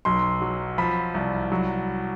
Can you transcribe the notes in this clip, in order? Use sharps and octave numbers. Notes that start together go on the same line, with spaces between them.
B1 C6
F#3
F3 B5
C2
F#3